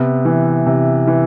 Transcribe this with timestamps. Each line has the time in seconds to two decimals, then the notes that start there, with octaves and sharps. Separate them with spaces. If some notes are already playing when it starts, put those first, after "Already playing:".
Already playing: C3 B3
0.25 E3
0.67 C3
1.07 E3